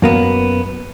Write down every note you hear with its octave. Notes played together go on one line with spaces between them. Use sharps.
F#2 A#3 B3